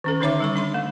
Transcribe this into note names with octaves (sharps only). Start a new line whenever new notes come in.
D#3 C#4 A4
D3 C#4 D#4 C#5 E5 D6
G3 A4 C#6
D4 B5 C6
A3